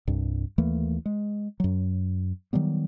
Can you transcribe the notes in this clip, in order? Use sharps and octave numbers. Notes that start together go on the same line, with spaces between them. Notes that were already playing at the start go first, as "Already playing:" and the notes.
C2 G2
D#2 E3 A3 A#3
G#3
F#2 F#3
D#3 F#3 G3 B3